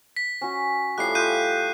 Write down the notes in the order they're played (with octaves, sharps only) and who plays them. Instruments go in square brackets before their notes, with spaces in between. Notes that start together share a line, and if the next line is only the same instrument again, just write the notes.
[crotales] B6
[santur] C#4 F#4
[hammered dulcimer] A2 F3 A5 [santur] G3 F5 G5 [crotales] F#6 C7
[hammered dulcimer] F3 E5 C6 [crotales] F#6 G6 D#7